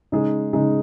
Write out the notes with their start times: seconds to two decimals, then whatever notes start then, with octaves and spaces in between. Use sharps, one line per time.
0.12 C#3 G#3 D#4 G#4
0.53 C#3 G#3 D#4 G#4